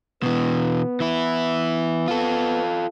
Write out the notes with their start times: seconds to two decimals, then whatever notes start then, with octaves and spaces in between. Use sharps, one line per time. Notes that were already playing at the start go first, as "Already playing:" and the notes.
0.23 B2 E3 B3
1.00 E3 E4
2.08 F4 A4